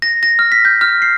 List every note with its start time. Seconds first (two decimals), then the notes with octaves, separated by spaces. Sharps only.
0.02 A#6
0.23 A#6
0.39 F6
0.52 B6
0.65 G6
0.81 F6
1.02 C7